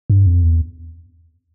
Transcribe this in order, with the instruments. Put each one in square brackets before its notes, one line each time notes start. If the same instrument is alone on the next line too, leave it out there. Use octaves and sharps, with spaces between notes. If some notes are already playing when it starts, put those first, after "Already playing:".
[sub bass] G2
F2
E2